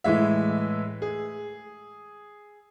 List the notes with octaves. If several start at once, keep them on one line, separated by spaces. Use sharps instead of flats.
A2 E3 G#3 E5
G#4